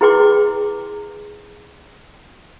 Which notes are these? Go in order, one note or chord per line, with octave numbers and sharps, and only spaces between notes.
E4 G#4 B4 G5 C6 D6